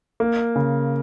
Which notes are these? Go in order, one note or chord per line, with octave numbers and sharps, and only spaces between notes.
A#3
C#3